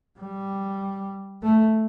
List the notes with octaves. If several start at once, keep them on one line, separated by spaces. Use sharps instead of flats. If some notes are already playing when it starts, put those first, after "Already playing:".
G3
A3